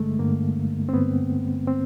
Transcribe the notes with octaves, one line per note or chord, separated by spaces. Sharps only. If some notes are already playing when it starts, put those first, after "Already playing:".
Already playing: G2 D3 G#3 A3
G2 D3 A#3
C4
G2 D3 B3
C4